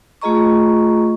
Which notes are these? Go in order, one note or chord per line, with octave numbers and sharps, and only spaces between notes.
A3 F4 G#4 D#5 A#5 C#6